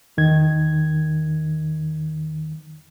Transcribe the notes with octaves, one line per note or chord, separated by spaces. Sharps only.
E2 D#3 G#6